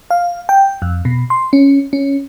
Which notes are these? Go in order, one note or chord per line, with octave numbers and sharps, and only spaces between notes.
F5
G5
F2
B2
C6
C#4
C#4